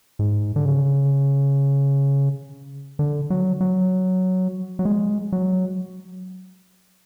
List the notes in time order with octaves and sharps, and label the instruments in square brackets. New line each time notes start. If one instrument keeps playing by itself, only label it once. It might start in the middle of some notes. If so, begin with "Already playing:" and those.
[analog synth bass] G#2
D3
C#3
D3
F#3
F#3
F#3
G#3
F#3